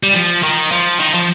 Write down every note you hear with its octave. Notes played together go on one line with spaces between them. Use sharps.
G3
F3
D#3
F3
D#3
F3